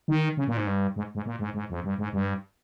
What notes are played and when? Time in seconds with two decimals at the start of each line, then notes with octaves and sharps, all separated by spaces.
0.08 D#3
0.37 C#3
0.47 A#2
0.57 G#2
0.67 G2
0.96 G#2
1.15 G#2
1.26 A#2
1.39 G#2
1.54 G#2
1.70 F2
1.84 G2
1.98 G#2
2.13 G2